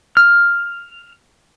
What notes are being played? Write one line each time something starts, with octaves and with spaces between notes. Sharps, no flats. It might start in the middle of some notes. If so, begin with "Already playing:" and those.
F6